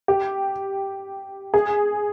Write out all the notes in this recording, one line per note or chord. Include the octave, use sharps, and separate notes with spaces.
G4
G#4